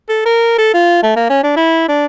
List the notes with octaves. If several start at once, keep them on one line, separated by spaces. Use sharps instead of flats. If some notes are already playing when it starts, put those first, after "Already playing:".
A4
A#4
A4
F4
A3
A#3
C#4
D4
E4
D4